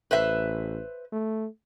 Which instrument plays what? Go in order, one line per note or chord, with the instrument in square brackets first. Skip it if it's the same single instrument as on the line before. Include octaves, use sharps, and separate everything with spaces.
[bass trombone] A1 [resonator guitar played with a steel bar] B4 C5 E5
[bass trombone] A3